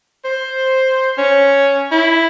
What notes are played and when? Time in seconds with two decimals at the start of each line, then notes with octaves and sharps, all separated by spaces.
0.25 C5
1.18 C#4
1.92 E4